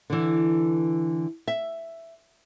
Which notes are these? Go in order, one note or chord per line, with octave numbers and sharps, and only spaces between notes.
D3 E3
E5